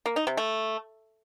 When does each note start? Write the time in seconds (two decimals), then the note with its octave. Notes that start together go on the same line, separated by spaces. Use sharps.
0.06 A#3
0.16 D#4
0.27 C3
0.37 A3